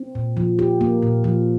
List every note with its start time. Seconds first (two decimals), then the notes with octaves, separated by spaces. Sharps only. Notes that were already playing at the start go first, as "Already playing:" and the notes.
Already playing: C4
0.15 A#2
0.37 F3
0.59 G4
0.81 A#3
1.02 A#2
1.24 F3